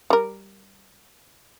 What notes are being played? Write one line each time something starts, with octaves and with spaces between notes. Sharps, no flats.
G3 A#4